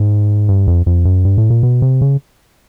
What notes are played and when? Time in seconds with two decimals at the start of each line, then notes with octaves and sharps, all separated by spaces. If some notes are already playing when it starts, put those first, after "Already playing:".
Already playing: G#2
0.49 G2
0.67 F2
0.86 F2
1.05 F#2
1.25 G2
1.38 A2
1.50 A#2
1.63 B2
1.82 C3
2.01 C#3